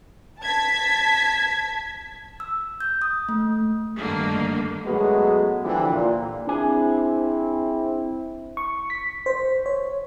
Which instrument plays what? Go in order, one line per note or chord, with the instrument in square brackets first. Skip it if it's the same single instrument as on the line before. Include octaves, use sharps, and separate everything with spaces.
[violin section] A5 G#6 B6
[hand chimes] E6
G6
D#6
A3
[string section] G2 D3 D#3 A3 A#3
[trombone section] F#2 F#3 G#3 A3 B3 F#4
D3 E3 F3 E4 G4
A#2
[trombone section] C4 E4 [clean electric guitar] D4 G#4 G#5
[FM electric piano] C#6
B6
C5
C#5